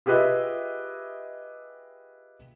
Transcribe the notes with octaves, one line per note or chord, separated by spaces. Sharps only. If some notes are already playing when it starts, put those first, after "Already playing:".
F4 G4 G#4 B4 D#5 E5